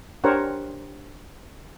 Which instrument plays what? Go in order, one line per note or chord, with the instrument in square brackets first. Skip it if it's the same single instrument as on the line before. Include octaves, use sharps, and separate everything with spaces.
[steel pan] D4 G4 A#4 C5 C#5 F#5